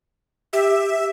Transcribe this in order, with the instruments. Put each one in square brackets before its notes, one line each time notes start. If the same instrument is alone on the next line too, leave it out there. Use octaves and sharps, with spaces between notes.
[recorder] G4 [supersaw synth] E5